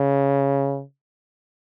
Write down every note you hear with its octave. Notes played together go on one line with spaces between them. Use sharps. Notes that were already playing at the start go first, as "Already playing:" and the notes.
Already playing: C#3